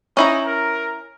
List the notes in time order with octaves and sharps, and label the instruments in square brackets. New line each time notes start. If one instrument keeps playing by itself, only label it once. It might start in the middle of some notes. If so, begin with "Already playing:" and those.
[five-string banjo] C#4 E4 A#5 [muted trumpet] D#4
[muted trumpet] A#4